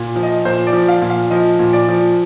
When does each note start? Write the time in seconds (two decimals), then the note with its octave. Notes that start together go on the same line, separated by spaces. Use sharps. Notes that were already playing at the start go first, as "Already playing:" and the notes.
Already playing: A#2
0.16 F3
0.23 D#5
0.45 A#2 C5
0.67 D5
0.73 F3
0.88 F5
1.02 A#2
1.10 F5
1.30 F3 D#5
1.59 A#2
1.73 D5
1.88 F3